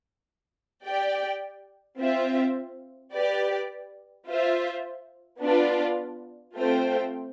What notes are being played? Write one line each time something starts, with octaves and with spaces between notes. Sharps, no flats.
G4 D5 G5
C4 F4 C5 E5
G4 B4 D5
F4 C5 E5
B3 D4 F4 B4 D5
A3 C4 F4 C5 G5